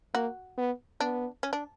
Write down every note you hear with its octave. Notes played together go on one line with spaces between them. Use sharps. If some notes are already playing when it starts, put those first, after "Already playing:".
A#3 F#4
B3
B3 D4
C#4
D4